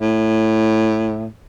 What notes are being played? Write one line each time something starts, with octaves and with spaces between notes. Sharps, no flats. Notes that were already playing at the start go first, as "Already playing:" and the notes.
A2